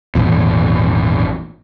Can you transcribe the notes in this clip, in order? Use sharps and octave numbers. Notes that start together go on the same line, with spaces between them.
G#1 E2 A#2